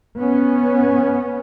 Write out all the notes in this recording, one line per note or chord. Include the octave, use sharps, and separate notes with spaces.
B3 C#4